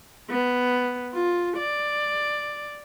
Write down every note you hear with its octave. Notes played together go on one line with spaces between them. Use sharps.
B3
F4
D5